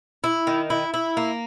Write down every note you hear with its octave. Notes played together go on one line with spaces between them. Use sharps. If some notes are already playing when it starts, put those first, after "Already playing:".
E4
D#3
E4
E4
A#3